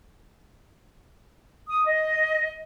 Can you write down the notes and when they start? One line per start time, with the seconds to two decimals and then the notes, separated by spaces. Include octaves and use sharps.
1.69 D#6
1.86 D#5